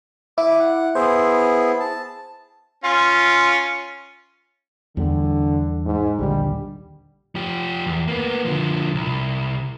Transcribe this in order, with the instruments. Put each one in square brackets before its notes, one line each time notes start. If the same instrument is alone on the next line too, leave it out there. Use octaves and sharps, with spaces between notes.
[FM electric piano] E4 [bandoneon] D6
[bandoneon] F#5
[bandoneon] B3 E4 G#4 [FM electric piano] C5
[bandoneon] A5
[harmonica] C#4 F4
[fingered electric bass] E2 G3 [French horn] D3
[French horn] G#2
[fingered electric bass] A#1 D#2 D3 [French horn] G3
[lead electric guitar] F3 G4
E2
A#3 B3
D3 F3
C2